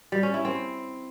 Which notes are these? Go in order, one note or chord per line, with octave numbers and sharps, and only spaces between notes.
G3
C#4
E4
C4